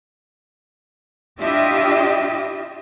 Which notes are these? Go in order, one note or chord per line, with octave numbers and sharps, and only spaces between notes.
D4 E4 F4 G4 D#5 E5